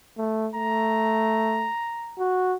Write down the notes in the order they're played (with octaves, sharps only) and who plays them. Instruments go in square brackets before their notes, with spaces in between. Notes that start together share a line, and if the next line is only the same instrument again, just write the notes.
[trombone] A3
[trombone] A3 [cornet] A#5
[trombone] F#4